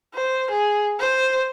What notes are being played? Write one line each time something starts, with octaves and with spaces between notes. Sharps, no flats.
C5
G#4
C5